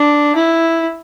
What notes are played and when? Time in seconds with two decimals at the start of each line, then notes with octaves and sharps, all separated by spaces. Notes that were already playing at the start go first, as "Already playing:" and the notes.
Already playing: D4
0.35 E4